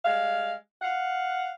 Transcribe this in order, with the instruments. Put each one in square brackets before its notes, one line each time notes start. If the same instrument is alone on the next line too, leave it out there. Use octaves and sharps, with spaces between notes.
[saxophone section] G3 G#3 F5
F5 F#5